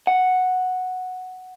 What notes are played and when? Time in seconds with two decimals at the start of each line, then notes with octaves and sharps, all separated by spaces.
0.07 F#5